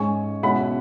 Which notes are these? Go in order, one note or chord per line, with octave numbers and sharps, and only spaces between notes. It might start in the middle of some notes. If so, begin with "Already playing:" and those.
Already playing: G#2 G#3 C#4 G#5 C#6
B2 G#3 C#4 E4 F#5 B5